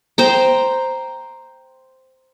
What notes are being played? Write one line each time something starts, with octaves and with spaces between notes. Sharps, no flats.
C5 G5 A#5